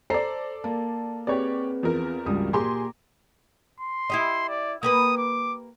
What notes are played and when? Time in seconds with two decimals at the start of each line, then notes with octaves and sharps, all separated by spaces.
0.10 A4 C5 D5 A#5 C7
0.64 A#3 A5
1.27 C4 G4 G#4 B4 C#5 D5
1.83 E2 F3 A#4
2.26 C#2 G2 F#4 G4 D#6
2.53 A#2 G4 G#4 A#5 C6 D6
3.80 C6
4.10 E4 G4 D#5
4.49 D5
4.83 A#3 G4 B4 D#6
5.17 D6